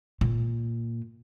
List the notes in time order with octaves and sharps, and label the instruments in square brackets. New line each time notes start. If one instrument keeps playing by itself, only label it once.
[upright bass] A#2